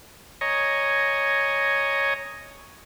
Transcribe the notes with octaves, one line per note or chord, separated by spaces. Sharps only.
C#5 D#5 G#5 A#5